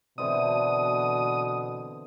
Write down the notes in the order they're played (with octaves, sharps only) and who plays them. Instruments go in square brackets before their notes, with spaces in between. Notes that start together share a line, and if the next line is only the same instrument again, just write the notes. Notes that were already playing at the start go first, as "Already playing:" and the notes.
[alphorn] B2 [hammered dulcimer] D3 E3 C4 [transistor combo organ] D#6